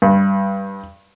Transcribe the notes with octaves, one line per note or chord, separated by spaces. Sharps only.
G2